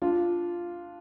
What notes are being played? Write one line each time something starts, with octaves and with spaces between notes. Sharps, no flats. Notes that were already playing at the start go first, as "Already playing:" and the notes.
D4 F4